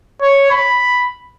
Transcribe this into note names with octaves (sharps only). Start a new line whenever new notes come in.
C#5
B5